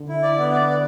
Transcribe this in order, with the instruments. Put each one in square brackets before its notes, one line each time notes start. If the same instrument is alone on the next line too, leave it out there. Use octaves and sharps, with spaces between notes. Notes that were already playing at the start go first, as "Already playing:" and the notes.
Already playing: [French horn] D3
[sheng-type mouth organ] E4
D5
B3
D5
B3